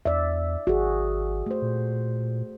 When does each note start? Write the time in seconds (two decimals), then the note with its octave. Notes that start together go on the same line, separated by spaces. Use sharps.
0.05 E2 D5 E5
0.67 G#1 F#4 G#4
1.46 A3 C5
1.62 A#2